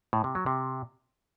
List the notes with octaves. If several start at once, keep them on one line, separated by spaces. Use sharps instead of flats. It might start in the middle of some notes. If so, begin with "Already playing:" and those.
A2
C3
F#3
C3